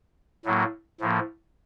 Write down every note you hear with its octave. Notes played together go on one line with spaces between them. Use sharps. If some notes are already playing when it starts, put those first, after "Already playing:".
A2 F#3 A#3
A2 F3 A#3